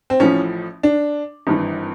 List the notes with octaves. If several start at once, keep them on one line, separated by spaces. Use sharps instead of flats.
C4
A1 A2 F3 C#4
D4
G#1 G2 E3